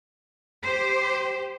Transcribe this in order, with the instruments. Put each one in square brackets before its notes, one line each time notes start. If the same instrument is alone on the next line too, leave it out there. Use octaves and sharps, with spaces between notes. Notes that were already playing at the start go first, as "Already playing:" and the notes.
[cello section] G4 C5